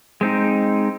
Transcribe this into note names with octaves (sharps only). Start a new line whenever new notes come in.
G#3 C4 D#4